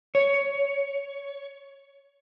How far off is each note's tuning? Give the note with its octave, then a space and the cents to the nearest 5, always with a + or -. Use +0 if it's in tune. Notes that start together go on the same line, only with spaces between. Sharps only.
C#5 +10